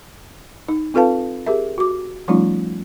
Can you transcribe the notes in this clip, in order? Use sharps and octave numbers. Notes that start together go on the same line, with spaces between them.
D#4
C4 F4 A4 B4 F5 A5
G4 G#4 A#4 E5
F#4 D6
F3 G3 A3 C#4 D#4 F4